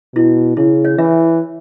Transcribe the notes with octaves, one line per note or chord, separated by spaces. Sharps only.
B2 E4
C#3 E4
C#5
E3 E5